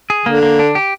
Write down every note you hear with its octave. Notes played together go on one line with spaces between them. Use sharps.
G#4
D3 A#3
A#3
D4
G4